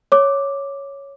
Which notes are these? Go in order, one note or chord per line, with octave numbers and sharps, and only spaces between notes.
C#5 D6